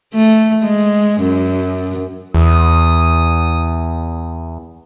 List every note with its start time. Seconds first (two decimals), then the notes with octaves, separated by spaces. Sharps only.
0.14 A3
0.63 G#3
1.21 F#2
2.34 E2 D#6